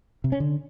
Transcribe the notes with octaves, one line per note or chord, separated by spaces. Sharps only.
C3
C#4
D3